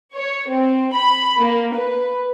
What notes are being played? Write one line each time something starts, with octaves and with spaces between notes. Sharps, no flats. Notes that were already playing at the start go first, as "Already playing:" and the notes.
C#5
C4
B5
A#3
B4